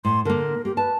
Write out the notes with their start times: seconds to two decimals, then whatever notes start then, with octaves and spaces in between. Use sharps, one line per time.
0.05 A2 C6
0.25 D3 A#3 A#4
0.65 A#3 G4
0.77 B4 A5